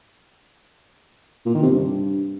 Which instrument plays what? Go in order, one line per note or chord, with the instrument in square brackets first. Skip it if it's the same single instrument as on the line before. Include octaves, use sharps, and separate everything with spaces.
[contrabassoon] A#2
D#3
C3
G2